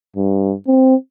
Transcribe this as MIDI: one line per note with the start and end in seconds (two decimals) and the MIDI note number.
0.16 0.54 43
0.67 0.95 60